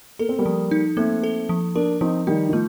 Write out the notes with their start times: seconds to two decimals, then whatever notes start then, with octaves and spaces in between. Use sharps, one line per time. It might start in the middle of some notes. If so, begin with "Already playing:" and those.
0.19 A#3 A4
0.29 C4
0.38 G3 A#3
0.46 F3
0.71 D#4
0.97 A3 A#3 C4
1.24 A4
1.49 F3
1.75 A#3 D4 A#4
2.01 F3 C4 D#4
2.27 D#3 G3 D#4
2.49 D#3
2.53 F3 A3